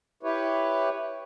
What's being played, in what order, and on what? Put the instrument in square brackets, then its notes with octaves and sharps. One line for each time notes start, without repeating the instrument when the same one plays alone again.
[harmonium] E4 G4 B4 C#5